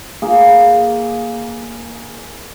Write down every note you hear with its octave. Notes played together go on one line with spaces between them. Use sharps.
A#3 G#4